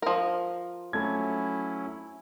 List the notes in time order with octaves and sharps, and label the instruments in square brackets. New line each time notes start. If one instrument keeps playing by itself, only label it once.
[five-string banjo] F3 A#4
[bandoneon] F#3 C#4 E4 [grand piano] A3 G#6